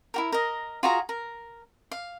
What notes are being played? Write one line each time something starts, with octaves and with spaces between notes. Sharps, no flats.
E4 F#4 A#4
A#4 D#5
F4 F#4 G#4 A#5
A#4
F5